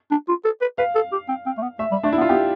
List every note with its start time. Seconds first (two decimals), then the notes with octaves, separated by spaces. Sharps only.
0.11 D4
0.28 F4
0.45 A4
0.61 B4
0.78 B4 F5
0.95 A4
1.12 G4
1.28 C4
1.46 C4
1.57 A3
1.62 B3
1.79 A3 E5
1.91 G3
2.03 A3 D4
2.13 E4
2.17 B3
2.21 F4
2.29 B3 G4